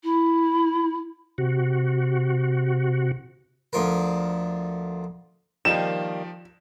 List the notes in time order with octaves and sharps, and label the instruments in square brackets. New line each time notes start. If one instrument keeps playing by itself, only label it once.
[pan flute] E4
[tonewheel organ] C3 F#4
[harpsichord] D2 F3 A#4
[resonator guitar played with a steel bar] D#3 G3 A#3 [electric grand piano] F3 G5 [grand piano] E7